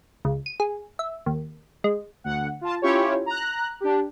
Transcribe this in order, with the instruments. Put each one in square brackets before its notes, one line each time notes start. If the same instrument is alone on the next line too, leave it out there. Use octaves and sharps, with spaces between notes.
[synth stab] C#2
D#7
G#4
E5
D#2
G#3
[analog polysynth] D2 F#5
F4 A5
C#4 E4 F4 G4 C#5
A#5 F#6
D4 G4